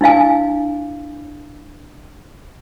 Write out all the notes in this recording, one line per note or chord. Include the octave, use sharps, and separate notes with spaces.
D4 E4 F5 G#5